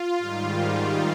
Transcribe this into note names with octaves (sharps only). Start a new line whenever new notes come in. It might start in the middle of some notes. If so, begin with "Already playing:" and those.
Already playing: F4
G#2 D#3 G3